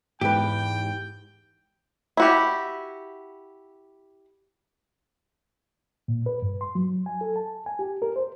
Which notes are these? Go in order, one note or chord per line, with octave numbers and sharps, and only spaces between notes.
E2 G#2 G4 B4 G5
E4 F#4 G4
A#2
B4
G2
C6
F#3
G#5
A4
A5
G#5
G4
A#4
C5